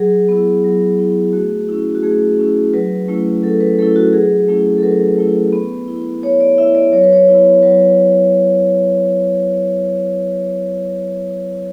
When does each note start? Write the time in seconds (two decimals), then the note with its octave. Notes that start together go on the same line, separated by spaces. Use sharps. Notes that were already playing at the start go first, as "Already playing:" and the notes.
Already playing: F#3 G#4
0.29 B3 E4
0.64 F#3
0.99 B3 E4
1.33 A3 F#4
1.69 C#4 E4
1.95 F#4
2.03 A3 G#4
2.39 C#4 E4
2.74 F#3 B4
3.08 A3 C#4 E4
3.43 F#3 A4
3.61 B4
3.79 A3 C#4 E4 A4
3.96 F#4
4.13 F#3 G#4
4.48 A3 C#4 E4
4.78 A4
4.83 F#3 B4
5.18 A3 C#4 E4
5.53 B3
5.88 E4
6.22 B3 C#5
6.41 D5
6.58 E4 E5
6.75 D5
6.92 F#3 C#5
7.03 B4
7.13 C#5
7.28 B3 E4
7.62 F#3 B4